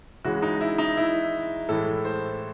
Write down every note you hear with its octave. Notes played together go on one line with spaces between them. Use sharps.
C#3 E3 G#3 F#4
D#4
E4
D#4
E4
A2 E3 G#3 A4
C5